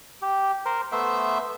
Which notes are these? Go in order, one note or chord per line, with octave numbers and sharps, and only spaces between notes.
G4
A#4 C5
A3 B3 C5 E5